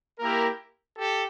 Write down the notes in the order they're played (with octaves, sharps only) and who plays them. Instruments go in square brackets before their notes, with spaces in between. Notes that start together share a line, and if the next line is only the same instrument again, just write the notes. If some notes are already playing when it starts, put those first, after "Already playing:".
[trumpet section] A#3 E4 G4 A#4
G4 A4